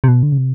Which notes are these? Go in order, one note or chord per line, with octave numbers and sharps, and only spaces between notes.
C3
B2
D3
C#3
C3